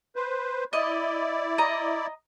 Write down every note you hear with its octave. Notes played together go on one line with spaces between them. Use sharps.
B4 C5
E4 D5 D#5
D#5 A#5